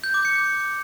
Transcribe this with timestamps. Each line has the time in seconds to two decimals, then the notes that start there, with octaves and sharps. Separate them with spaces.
0.04 G6
0.14 D6
0.25 C#7